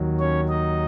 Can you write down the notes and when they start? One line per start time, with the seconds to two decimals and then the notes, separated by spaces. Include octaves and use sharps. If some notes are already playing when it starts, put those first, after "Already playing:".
Already playing: D#2 D#3 F#3
0.20 C#4 C#5
0.48 D#4 D#5